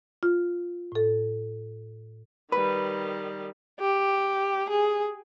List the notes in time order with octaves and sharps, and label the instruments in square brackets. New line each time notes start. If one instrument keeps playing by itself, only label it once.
[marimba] F4
A2 A4
[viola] D#3 G3 [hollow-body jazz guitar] B4
[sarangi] G4
G#4